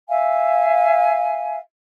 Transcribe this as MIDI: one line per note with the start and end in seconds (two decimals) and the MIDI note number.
0.08 1.58 76
0.08 1.58 77
0.08 1.58 80